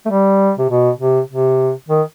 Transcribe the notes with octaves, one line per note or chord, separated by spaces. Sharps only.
A3
G3
C3
B2
C3
C3
D#3